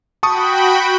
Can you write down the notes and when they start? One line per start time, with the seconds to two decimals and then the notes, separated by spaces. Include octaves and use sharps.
0.23 F#4 G5 A5 B5 C#6 D#6